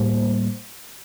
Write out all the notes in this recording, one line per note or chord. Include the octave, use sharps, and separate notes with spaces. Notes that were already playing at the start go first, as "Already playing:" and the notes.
Already playing: A2 G3 A#3 C5